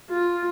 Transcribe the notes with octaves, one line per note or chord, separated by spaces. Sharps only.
F4